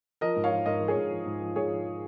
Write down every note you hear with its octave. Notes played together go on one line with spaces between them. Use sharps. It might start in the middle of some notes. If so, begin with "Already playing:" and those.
F3 A#4 D#5
G#2
C#5 F5
F3
G#2 A#4 D#5
F3
G#4 C#5
G#2
F3
G#2
F3
G#2 G#4 C#5
F3